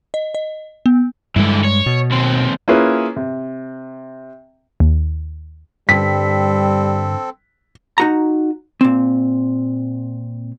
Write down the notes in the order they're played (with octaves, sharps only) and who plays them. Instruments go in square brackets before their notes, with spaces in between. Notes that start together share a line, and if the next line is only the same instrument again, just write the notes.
[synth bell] D#5
D#5
B3
[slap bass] G2 G#3 [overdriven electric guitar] D3 E3
[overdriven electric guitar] C#5
[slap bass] B2
[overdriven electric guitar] D#2 C4
[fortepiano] A#3 C#4 E4 F4 G#4 B4
C3
[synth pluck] D#2
[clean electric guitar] G2 D3 [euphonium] G3 [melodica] C4 A4 [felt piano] B6
[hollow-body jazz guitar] D#4 F#4 A#5
A#2 C4